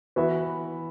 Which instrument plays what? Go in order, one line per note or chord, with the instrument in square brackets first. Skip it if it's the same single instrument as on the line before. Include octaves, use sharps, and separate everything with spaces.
[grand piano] E3 B3 F#4 B4 E5